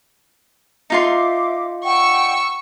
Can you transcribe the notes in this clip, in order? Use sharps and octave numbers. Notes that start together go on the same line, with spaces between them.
D#4 F4 E5 C6 D6
D5 F#5 G5 C#6 E6